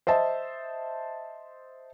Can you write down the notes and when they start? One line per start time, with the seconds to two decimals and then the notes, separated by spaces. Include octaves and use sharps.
0.07 C5 D#5 E5 A5